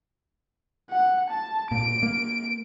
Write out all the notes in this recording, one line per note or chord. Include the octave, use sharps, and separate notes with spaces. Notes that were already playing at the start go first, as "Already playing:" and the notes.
F#5
A5
A#2 D7
A#3